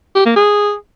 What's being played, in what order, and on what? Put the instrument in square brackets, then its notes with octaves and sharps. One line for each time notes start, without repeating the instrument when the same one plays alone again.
[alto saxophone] G4
A#3
G#4